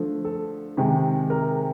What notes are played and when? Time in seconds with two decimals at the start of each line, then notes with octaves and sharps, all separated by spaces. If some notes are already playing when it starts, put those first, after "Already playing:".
Already playing: D3 F3 A3
0.25 A4
0.77 C3 D#3 G#3
1.30 A#4